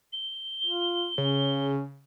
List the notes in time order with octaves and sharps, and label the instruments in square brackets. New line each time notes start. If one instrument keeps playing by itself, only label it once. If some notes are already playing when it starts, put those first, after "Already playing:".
[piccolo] G7
[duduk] F4
[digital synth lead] C#3 [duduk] C#4